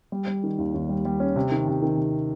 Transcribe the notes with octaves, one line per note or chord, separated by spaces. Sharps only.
G3
G3
D#3
D#2
D#2
G3
G3
C#4
C3
D#3
C3
D#3
C3